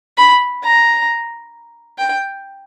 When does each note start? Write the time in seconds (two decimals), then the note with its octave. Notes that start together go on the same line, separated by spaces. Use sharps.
0.17 B5
0.64 A#5
1.99 G5